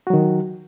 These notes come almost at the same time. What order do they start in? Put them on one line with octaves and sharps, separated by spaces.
F#4 F#3 D#3